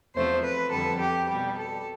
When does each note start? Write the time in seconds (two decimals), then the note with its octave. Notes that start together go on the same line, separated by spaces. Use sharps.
0.15 E2 C3 F3 A3 C5
0.44 B4
0.71 F2 D3 G3 A4
1.00 G4
1.29 B2 G3 G4
1.58 A4